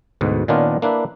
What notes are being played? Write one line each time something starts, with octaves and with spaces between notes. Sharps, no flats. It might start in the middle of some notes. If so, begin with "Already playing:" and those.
D2 G#2 B2
A#2 D#3 B3 C#4 D4 F4
A#3 D4 E4 B4